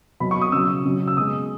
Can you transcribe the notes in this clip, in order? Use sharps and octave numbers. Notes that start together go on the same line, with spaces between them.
B2 F#3 B5
C#6
D#6
C#3 F#3 E6
C#3 F#3
E6
B2 G#3 D#6